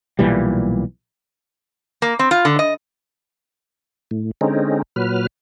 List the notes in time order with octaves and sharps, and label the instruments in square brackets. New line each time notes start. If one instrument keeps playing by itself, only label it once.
[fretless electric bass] B1 A#2 E3 G3
[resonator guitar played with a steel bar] A#3
C4
F4
D3
D#5
[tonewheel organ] A2
D3 G#3 C4 C#4 D#4
A#2 F#3 B4 F6